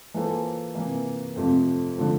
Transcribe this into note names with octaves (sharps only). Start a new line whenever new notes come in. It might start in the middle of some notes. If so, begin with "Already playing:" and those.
E3 A#3 F4 A4 C5
C3 E3 A#3
F2 C3 F3 A3 C4
D3 F3 A3